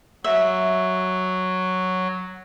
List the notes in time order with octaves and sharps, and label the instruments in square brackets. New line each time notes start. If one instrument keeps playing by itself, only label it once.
[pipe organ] F#3 [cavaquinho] E5